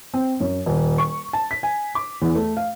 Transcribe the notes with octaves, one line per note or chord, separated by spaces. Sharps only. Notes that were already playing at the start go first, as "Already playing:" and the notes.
C4
F#2
D#1
C#6
A5
B6
G#5
D6
E2
A3
F5